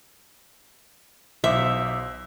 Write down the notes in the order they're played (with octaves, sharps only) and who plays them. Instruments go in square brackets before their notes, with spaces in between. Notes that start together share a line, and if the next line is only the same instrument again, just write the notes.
[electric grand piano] B1 C5 D6 [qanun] E5